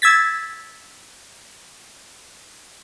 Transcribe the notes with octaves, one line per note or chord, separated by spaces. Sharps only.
E6 G#6 A6 B6